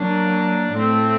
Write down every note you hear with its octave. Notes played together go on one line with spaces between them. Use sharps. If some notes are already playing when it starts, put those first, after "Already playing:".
Already playing: F#3 A#3 D4
A2 A3 C4